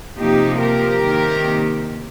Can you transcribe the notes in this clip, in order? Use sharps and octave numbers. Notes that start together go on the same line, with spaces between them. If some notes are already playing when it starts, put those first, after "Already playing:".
C3 F3 A#3 D#4 G4
G4 A#4
C3 D#3 A#3